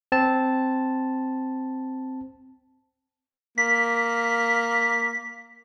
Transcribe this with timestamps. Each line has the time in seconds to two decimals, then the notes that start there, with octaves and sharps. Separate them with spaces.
0.12 C4 A5
3.58 A#3 B6